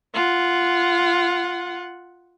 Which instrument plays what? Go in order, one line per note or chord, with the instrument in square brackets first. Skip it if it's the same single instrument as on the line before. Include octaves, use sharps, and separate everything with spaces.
[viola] F4 F#5